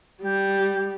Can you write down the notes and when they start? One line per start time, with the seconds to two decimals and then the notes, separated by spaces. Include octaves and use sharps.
0.22 G3 G4